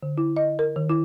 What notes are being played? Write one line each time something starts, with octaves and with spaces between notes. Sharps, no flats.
D3
E4
D#5
A#4
D#3
E4